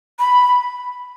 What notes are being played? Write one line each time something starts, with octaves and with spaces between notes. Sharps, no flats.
B5